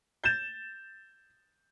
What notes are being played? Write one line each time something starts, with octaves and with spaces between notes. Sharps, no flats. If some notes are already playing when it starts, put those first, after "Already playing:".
G6 A6 E7